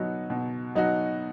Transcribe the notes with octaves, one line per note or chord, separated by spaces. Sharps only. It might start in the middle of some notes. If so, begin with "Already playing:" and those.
Already playing: B2 F#3 B3 D#4 F#4
B2
F#3 B3 D#4 F#4